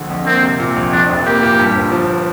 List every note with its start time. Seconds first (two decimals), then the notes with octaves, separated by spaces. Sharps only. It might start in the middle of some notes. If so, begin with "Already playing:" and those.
Already playing: A#1 D3
0.10 F2
0.26 A#3 C4
0.43 C3
0.60 A#2
0.76 A#1
0.92 F2 D4
1.09 F1
1.26 A#3 G4
1.43 A#2
1.59 G2
1.75 G1
1.92 F3